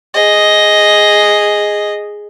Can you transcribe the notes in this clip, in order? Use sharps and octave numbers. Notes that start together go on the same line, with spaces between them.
G#4 D#5